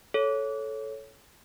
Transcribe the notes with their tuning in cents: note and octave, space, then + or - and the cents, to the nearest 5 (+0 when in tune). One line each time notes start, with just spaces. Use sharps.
A4 -10 C#5 +0